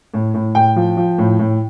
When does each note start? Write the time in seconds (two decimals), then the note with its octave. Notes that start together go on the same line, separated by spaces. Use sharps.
0.14 A2
0.34 A2
0.55 A2 G5
0.76 F3
0.97 F3
1.18 A2
1.39 A2